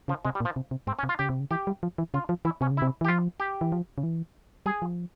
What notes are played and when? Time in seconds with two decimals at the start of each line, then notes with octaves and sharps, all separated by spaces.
0.08 C#3 F3
0.25 C3 G#3
0.35 G3
0.40 A#2
0.45 F3
0.56 C3
0.71 C3
0.87 G#2 C4
0.99 C#4
1.03 C3
1.09 F4
1.19 C#3 G4
1.30 C3
1.40 C#3
1.51 E3 G4
1.67 G3
1.83 F3
1.98 E3
2.14 C#3 F4
2.29 F3
2.45 E3 E4
2.61 C3 C#4
2.71 C#3
2.77 E4
2.82 C3
3.01 E3
3.05 G4
3.08 F3 F4
3.40 G4
3.61 E3
3.72 F3
3.98 C#3
4.03 E3
4.66 G3 G#4
4.82 F3